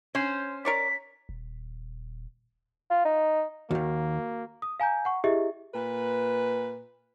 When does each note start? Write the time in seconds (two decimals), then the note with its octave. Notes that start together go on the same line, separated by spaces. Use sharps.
0.15 C#4 C5
0.65 A#4 C#5 D5 B6
1.29 D#1
2.91 F4
3.05 D#4
3.71 D#2 D#3 A#3 F#4
4.62 D#6
4.80 F5 G#5 A#5 G6
5.05 F#5 C#6
5.24 E4 G4 G#4 D#5 E5
5.74 A#2 B4